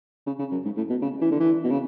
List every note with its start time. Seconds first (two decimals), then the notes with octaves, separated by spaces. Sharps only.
0.27 C#3
0.39 C#3
0.52 F#2
0.65 G#2
0.77 A2
0.90 B2
1.02 C#3
1.21 E3
1.32 D3
1.40 E3
1.63 B2
1.71 C#3